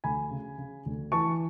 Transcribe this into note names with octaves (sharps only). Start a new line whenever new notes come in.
D2 G#5 B5
C#3
C#3
D2
E3 A5 C#6